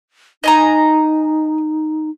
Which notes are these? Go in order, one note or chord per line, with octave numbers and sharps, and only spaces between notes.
D#4 D#5 G#5 A#5